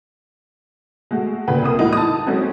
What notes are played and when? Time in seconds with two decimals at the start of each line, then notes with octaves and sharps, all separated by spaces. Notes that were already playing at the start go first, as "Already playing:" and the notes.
1.11 G#3 A3 F#4
1.47 A#2 C#3 B4 G5
1.62 C2 A#3 D#6
1.78 A2 E3 G3 G#3 D#4 F#4
1.93 A5 D#6
2.26 F#3 G#3 C4 C#4 D#4 F#4